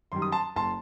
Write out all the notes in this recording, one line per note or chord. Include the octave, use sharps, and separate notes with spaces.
F#2 D#3 G3 C6
D#6
A5 C6
F#1 A5 C6